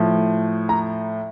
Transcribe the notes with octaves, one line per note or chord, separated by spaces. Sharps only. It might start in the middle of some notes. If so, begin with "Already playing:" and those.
Already playing: A2 F3
A#5